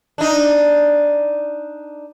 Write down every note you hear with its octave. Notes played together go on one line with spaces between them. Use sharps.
D4 D#4